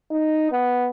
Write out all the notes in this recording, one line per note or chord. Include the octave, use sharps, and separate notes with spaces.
D#4
B3